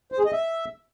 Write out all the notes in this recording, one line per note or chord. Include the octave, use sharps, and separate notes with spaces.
C5
G#4
D#5
E5